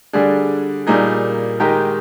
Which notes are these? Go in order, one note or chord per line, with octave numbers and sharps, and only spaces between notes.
D3 G3 D4 G#4
A#2 G3 A#3 D#4 G#4
D#3 G#3 D#4 G4 A#4